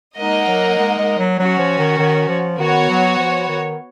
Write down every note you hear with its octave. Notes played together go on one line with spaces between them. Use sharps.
G#3 A#3 D#4 A#4 D#5 F#5
F#3
G#3
G#3
F#3
F#3 C#4 F#4 C#5
F3
D#3
D#3
F3
D#3 B3 F#4 C#5
F#3
F3
D#3